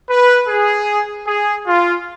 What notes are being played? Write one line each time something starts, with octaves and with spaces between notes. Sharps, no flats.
B4
G#4
G#4
F4